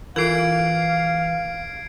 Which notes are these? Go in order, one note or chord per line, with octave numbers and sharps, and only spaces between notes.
E3 F4 A4 A#4 F5 G#6 C7 D7